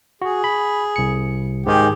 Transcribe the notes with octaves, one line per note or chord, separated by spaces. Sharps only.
F#4 G#4
B5
C2 C#7
G#2 D#3 G4 G#4 G5